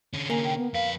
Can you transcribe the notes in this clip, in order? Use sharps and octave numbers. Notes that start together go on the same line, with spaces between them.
D3 C#4
A#3 G#5
G5
B3
F2 B4 F5